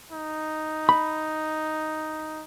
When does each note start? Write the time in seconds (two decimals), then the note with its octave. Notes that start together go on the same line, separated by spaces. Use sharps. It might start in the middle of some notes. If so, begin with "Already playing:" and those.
0.12 D#4
0.89 B5